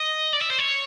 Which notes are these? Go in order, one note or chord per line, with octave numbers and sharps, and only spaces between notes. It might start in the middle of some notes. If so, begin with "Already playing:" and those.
Already playing: D#5
D5
E5
C5
C#5